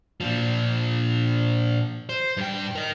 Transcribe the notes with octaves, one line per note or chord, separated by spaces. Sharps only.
A#2 F3
C5
G2 G5
A#4 D#5